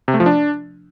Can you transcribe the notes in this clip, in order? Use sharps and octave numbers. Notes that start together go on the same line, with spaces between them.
C3
A3
F3
D4